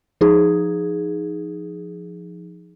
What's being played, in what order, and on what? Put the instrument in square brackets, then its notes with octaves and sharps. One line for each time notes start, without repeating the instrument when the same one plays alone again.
[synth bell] F3 D#4 G#4